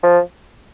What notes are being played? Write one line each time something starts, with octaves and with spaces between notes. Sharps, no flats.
F3